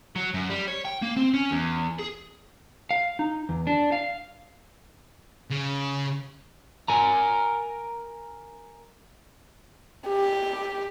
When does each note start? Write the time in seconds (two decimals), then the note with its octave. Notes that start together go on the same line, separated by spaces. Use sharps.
0.16 F#3
0.34 F#2
0.49 G3
0.68 C#5
0.85 G5
1.02 A#3
1.17 C4
1.34 C#4
1.51 E2
1.99 G#4
2.91 F5
3.19 D#4
3.49 E2
3.67 D4
3.92 F5
5.51 C#3
6.88 A#4 G#5 A#5
10.08 G4